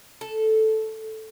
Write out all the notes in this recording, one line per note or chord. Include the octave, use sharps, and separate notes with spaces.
A4